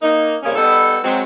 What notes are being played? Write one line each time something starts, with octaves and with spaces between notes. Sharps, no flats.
A#3 D#4
F2 A#2 C#3 G3 A#3 C#4
G3 B3 D#4 A4
F#3 G#3 C4